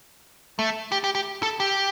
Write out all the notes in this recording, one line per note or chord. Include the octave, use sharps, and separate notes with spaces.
A3
G4
G4
G4
A4
G4